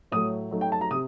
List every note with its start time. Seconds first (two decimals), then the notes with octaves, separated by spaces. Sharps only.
0.12 A2 F#3 A3 D#6
0.51 F#3 A3 D#4
0.61 G5
0.72 A5
0.81 A#5
0.91 C3 D#6